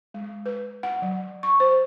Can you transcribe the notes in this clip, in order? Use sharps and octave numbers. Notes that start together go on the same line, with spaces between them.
G#3
B4
F#5
F#3
C#6
C5